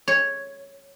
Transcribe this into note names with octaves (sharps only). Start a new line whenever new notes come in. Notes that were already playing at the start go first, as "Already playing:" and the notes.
C#5